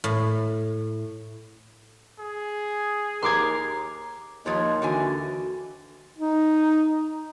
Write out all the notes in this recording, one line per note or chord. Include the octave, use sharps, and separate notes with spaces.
A2
G#4
D#2 A#4 C6 D6 G#6
D#2 F3 F4 C#5 D#5
D3 E3 F#4 G#5
D#4